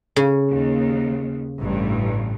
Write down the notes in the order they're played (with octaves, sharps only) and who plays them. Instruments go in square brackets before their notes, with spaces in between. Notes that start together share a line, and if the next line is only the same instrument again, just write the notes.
[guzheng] C#3
[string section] D#2
A1 G2